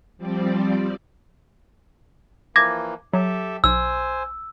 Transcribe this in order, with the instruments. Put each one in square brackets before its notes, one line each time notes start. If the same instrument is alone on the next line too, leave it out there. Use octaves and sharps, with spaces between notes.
[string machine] F3 G3 C4 D5
[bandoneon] E3 F3 A#3 [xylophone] D6 G#6 A#6
[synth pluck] F#3 [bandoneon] G4 A4 E5
[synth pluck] B1 [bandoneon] C5 G#5 [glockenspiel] E6